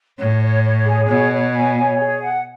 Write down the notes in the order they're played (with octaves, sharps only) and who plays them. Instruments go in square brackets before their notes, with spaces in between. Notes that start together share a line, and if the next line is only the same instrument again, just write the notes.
[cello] A2 [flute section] C#5
[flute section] C#5
C#5
G#4
[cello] B2 [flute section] C#5
[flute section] C#5
G#5
C#5
G#4
F#5